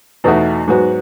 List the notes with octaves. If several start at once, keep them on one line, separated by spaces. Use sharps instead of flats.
E2 B2 A3 D#4 F#4
G#2 F#3 B3 F#4